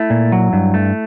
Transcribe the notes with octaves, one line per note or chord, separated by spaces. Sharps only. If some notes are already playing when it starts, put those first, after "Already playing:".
Already playing: A3 E4
A#2
F#3
G2
A3